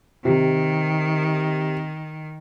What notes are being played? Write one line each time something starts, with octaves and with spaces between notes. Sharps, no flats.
C3 D#3